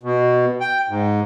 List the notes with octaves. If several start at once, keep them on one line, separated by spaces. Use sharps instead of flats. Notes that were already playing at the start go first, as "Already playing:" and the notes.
B2
G5
G#2